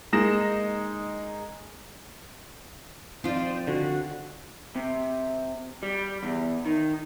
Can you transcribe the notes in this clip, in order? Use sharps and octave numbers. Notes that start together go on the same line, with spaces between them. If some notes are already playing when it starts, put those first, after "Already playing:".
G#3 A#3 D#4 A#6 E7
F3 C4 D#4 F4 C5 D5
D3 F#4
C3
G3
E2
D#3